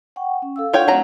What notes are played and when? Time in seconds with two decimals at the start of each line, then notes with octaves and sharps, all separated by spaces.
0.16 F#5 G5 C#6
0.42 C#4
0.56 A4 F5 E6
0.73 D4 F4 C#5 F#5 G5
0.88 F#3 A3 C4 A#5